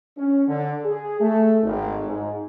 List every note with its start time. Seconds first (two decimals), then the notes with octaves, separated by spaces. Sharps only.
0.17 C#4
0.47 D3
0.85 G#4
1.20 A3
1.63 G#1
2.05 G#2